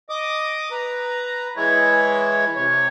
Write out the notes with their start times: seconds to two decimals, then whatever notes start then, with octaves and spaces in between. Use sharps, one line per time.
0.09 D#5 D6 D#6
0.71 B4 A#5
1.56 E3 G#3 E4 C#5
2.56 C3 C#5